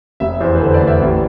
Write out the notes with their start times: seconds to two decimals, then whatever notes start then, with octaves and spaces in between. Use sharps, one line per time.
0.20 F1 E5
0.40 E2 C5
0.55 B4
0.61 D3 C5
0.74 D5
0.81 A3
0.87 E5
1.01 A1